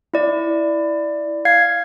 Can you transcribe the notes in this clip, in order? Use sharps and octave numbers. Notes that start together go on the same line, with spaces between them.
E4 D5
F5 G#6 C7